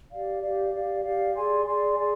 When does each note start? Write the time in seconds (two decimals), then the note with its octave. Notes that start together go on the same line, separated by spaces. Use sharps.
0.11 G4 D5 F5
0.43 G4 D5 F5
0.73 G4 D5 F5
1.04 G4 D5 F5
1.35 G#4 D5 G#5 C6
1.66 G#4 D5 G#5 C6
1.97 G#4 D5 G#5 C6